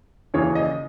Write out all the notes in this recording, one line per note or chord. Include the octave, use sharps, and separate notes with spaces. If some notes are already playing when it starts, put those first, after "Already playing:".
D#2 C#3 E3 C#5
D#5